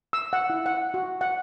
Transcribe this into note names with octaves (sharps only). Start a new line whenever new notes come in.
E6
F#5
E4
F#5
F#4
F#5